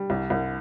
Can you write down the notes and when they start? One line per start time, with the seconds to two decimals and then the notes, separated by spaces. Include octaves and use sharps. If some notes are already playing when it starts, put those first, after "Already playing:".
Already playing: G3
0.10 C2
0.30 C2